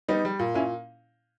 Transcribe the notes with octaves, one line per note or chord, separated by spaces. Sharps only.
G3 B3 D#4
G3
A#2
A#2 C#4 E4